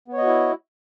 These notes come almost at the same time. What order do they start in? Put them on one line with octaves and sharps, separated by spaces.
B3 C#5 D#5 F#4 E4